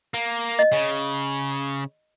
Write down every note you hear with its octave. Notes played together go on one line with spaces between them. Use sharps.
A#3
D#5
C#3